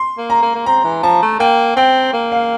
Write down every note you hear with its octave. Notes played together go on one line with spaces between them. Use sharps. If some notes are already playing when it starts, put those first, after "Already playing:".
Already playing: C6
A#3
A#5
A#3
A#3
C4 A#5
E3
F3 A5
A3
A#3 G5
C4 G5
A#3
F5